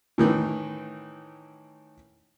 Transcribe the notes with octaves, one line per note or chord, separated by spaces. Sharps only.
A2 D#3 E3